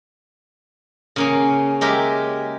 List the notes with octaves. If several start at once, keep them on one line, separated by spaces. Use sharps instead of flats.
C#3 A#3 C#4
G#3 G4 A#4 E5